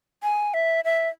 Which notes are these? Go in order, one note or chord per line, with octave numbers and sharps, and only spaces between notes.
G#5
E5
E5